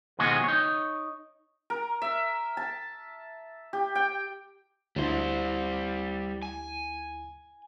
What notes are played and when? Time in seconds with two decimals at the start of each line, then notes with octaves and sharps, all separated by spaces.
0.19 D#2 B2 F3 G#3 F#4 G#4
0.44 D#4 C#5
1.70 A#4
2.02 E5
2.57 A5
3.73 G4
3.95 G5
4.96 D2 G3 E4 C5
6.42 G#5